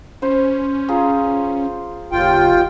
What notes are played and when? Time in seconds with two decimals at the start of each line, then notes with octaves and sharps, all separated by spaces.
0.22 C#4 C5
0.88 F4 G#4 A#5
2.12 F#1 D#2 F4 G5